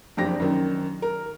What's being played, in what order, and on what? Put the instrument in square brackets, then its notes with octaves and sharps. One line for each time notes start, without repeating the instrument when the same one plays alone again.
[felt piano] F#1 F2 D4 G4 A#6
F#2 D#3
A#4